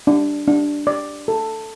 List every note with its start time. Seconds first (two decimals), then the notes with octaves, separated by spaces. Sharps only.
0.07 D4
0.47 D4
0.87 D5
1.28 A4